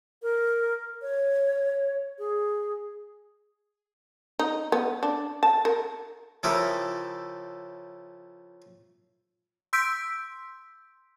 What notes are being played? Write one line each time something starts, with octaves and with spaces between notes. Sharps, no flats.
A#4
C#5
G#4
D#4
B3
D4
A5
A#4
C#3 F3 E4 G4 A4 A#4
C6 E6 G6 B6 D7